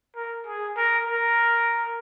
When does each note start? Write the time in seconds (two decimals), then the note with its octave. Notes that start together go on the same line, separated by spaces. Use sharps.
0.15 A#4
0.46 G#4
0.77 A#4
1.07 A#4